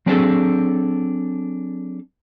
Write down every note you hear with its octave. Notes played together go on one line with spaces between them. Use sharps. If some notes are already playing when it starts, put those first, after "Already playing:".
F#3 C4 D4 G#4 A4